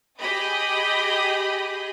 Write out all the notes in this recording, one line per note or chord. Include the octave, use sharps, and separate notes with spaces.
G4 G#4 D#5 G5 B5 D#6